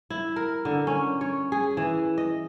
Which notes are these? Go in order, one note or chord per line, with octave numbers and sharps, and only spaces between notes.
E4
A#4
D3
C#4
C#5
G#4
E3
D#5